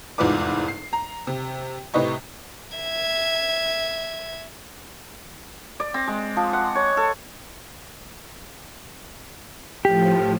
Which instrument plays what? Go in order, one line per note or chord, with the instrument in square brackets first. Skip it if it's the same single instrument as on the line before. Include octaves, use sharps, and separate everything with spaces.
[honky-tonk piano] F1 E2 G#2 F4 B4 D6
C7
A#5
C3
A2 C3 B4 D#5 C#6
[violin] E5 G#6
[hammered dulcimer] D5
C4
G#3
F3
F#5
C#5
A4
[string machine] A2 F3 [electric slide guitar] G4